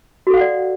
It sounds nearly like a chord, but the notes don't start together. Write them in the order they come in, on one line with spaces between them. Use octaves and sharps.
F#4 A4 F5 F#5 D5